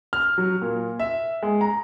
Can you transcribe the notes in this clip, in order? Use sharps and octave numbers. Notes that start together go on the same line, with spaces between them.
F6
F#3
A#2
E5
G#3
A#5